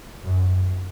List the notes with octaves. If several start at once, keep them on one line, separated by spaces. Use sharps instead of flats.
F#2